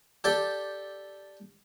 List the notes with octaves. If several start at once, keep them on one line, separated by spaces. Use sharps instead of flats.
G4 A4 D5 G5